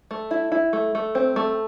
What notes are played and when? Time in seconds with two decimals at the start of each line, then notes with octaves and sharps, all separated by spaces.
0.11 A3
0.31 E4
0.52 E4
0.73 A3
0.95 A3
1.15 C4
1.36 A3